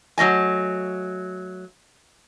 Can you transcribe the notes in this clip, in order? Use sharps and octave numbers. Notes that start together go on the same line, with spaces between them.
F#3 A3 D#5 G#5